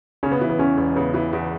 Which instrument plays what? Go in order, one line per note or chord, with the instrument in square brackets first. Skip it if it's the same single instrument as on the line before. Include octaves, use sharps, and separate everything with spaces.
[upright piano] C#3 [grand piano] C#4
[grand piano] B3
[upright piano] E3
[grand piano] B3
[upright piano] E2 [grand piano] C#4
[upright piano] E1
[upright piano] C#3 [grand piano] B3
[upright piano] E3
E2